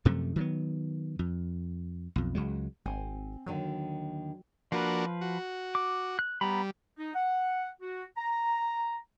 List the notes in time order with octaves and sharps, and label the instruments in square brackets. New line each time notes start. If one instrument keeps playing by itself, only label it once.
[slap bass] F#2 C3 F3 A3
D#3 F#3 B3
F2
B1 F2
C#2 F#3 G#3
[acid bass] G#1 [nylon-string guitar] C4 F#5 G#5
[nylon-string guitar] D#2 D3 D#3 [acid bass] F#3
[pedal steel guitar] F3 B4 [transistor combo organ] A#3 D4 F#4
[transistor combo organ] F#4
[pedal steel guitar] D6
F#6
[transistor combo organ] G3 [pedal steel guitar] B3 A#5 B5
[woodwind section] D#4
F#5
F#4
A#5